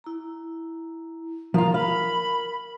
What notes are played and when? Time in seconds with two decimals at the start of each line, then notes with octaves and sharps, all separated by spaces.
0.04 E4 A#5
1.54 F3 F4 A#4 A#5
1.74 F5 B5